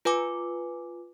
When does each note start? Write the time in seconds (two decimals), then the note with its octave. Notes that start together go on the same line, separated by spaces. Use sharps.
0.05 F4 B4 G#5 D6